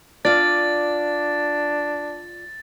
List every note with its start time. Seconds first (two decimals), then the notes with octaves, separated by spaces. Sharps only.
0.25 D4 F4 D5 A6